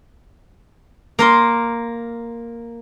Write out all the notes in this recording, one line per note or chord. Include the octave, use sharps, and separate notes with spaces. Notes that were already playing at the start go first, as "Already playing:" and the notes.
A#3 A#4 C6